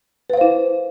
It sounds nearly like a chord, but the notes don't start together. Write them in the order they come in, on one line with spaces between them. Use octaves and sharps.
B4 F5 C5 E4